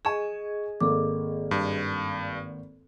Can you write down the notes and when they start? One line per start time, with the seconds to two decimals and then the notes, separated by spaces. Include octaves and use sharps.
0.05 G#4 D#5 G#5 C#6 E7
0.81 G#1 A#3 A4 D6
1.51 G2